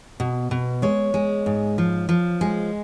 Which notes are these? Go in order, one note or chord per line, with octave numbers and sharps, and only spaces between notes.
B2
B2
G#3 C#5
G#3
G#2
F3
F3
G#3